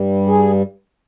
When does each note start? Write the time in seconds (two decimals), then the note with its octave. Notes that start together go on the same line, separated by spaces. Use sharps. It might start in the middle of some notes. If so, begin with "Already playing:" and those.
Already playing: G2 G3
0.27 G#4